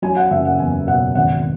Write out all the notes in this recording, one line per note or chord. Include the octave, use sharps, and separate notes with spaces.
F#3 G#5
F#5
F#1 E5
F#5
E2 G#5
B2 F#5
G#1 F#5